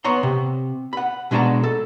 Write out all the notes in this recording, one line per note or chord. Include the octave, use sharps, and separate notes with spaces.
B3 C#5 A#5 C6
C3
F#5 B5
B2 G#3 D4 F#4 A5 A#5
A4